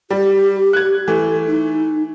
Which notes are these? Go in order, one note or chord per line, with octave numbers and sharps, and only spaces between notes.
G3 G4
F#6 G#6
E3 A3 A4
D#4